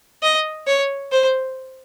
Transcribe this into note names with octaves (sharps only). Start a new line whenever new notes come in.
D#5
C#5
C5